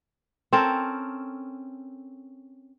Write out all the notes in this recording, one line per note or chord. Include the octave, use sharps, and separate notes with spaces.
C4 C#4 A4 A#4